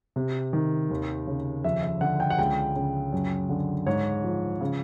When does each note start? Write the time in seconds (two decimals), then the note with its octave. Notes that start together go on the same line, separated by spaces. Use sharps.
0.16 C3
0.53 D#3
0.90 D#2
1.27 C#3
1.64 F2 E5
1.83 E5
2.01 D3 F#5
2.20 G5
2.30 F#5
2.38 C#2 G5
2.75 C#3
3.13 F#2
3.49 D3
3.86 G#2 C#5
4.24 F3
4.61 C#3